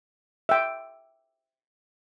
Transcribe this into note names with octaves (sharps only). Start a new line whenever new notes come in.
E5 G5